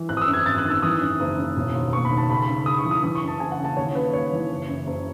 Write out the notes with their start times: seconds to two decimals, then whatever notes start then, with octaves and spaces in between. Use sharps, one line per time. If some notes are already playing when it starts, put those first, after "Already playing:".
Already playing: E3
0.09 G#1 F#6
0.17 D#6
0.22 E6
0.28 F#2
0.33 G#6
0.46 G#1 A6
0.58 F#6
0.65 D#3
0.70 E6
0.83 E3 D#6
1.01 F#2
1.20 F#1
1.38 C#3
1.57 E1
1.75 D#2
1.92 E1 C#6
2.05 B5
2.12 D#3
2.17 A5
2.30 C#2 B5
2.42 B5
2.48 C#3
2.66 C#2 D#6
2.78 C#6
2.85 E3
2.91 D#6
3.03 E3 D#6
3.15 C#6
3.22 F#2
3.28 A5
3.40 F#1 G#5
3.52 F#5
3.59 C#3
3.65 A5
3.77 D#2 C#5
3.95 C#3 B4
4.13 D#2 C#5
4.32 E3
4.51 F#1
4.69 F#2
4.87 F#1